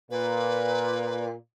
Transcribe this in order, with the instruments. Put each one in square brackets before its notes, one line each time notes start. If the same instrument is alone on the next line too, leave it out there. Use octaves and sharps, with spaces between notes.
[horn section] A#2 [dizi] B4